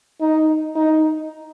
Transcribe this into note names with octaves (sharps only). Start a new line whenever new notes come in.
D#4
D#4